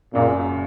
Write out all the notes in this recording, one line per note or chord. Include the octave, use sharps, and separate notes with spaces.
F#1 F#2 A#2 C#3